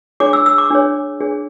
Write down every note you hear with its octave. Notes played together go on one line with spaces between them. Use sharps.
D4 G#4 C#5 D6
E6
E6
D6
D4 G#4 C#5
D4 G#4 C#5